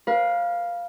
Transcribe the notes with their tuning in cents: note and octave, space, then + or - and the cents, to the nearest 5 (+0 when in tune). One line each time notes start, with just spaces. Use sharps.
B4 -45 F5 +0